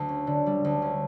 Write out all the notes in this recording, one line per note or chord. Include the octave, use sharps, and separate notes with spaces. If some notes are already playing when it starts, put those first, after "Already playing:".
Already playing: D2
C#4
D3
G3
D2
C#4